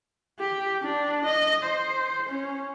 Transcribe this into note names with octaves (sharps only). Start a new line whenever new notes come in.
G4
D4
D#5
C5
C#4